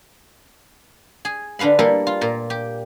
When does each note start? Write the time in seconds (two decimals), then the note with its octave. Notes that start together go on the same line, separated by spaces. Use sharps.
1.25 G#4
1.59 D3 D4 B4 F5 B5
1.79 G3 A#3 E4 A4 A#4
2.07 F4
2.21 A#2 A#4
2.50 G4